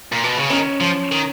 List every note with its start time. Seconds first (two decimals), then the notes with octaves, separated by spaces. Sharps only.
0.12 A#2
0.24 B2
0.37 C#3
0.50 D#3 C#4
0.80 F3
1.12 D#3